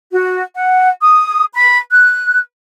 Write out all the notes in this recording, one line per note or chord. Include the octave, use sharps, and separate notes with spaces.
F#4
F#5
D#6
B5
F#6